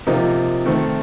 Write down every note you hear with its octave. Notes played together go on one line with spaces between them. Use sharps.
C3 F3 A#3 D#4
D#3 A3 C4